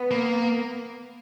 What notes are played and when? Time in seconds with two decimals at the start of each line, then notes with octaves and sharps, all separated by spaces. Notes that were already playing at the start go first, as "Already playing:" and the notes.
Already playing: B3
0.11 A#3